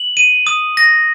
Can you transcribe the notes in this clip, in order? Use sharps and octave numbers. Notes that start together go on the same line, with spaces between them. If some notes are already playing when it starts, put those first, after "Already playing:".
Already playing: F#7
D#7
D#6
A#6